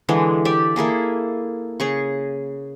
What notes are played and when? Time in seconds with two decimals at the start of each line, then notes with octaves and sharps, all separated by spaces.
0.09 D3 E3 G#3
0.45 G4 D5 E5
0.76 A#3 E4 G#4 A4
1.80 C#3 G#4 C#6